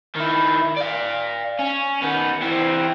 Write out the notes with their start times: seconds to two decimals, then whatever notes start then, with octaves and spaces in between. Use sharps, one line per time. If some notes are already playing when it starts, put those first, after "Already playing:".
0.16 D#3 E4
0.76 D5 F5
1.59 C#4
2.02 D#3 B3
2.43 E3 C4